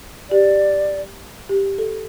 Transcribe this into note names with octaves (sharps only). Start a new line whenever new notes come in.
G4 D5
G4
A4